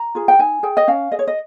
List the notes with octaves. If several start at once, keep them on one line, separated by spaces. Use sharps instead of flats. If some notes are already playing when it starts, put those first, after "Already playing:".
Already playing: A#5
F4 G#4
G5
D#4 G#5
G#4 G5
D#5
C#4 F5
G#4 D#5
C#5
D#5